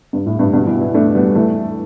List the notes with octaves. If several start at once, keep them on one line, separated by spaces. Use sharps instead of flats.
G2
A2
G2
G2 B2
B2 E3
B3 E4
A3 D4
G3 B3
E3 A3